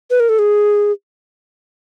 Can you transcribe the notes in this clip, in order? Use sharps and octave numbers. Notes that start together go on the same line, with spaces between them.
B4
A#4
A4
G#4